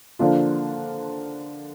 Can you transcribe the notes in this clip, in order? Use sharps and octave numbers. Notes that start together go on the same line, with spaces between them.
D3 F3 A#3 D4 F4